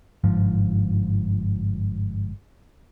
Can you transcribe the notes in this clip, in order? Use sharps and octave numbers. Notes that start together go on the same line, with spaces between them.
G1 G#2 F3